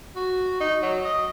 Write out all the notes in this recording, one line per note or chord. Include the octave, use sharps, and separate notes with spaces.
F#4
D#4
F#3
D#5